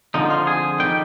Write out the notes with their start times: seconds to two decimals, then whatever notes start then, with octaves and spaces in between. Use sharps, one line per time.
0.14 F2 D3 F3 D#4
0.30 F4
0.47 G#4
0.80 D#3 G3 G5